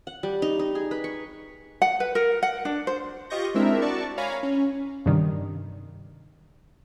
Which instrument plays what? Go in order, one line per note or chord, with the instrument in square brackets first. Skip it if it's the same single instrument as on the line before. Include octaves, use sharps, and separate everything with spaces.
[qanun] F#5
G3
D#4
D#4
G#4
B4
C#6
[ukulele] F#5
B4
A#4
F#5
D4
C5
[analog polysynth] F4 G4 D#5 C#6 G6 A#6
G#3 C4 D4 E4 A#4 E5
F#4 D5 A5 C#6
C#5 F5 G#5 A#5 B5
C#4
[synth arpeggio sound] G2 C3 D#3 G3